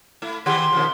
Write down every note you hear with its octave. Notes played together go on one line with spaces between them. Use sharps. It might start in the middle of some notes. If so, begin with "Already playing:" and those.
A3 E4
D#3 G4 G#4 C6
B2 D#3 F3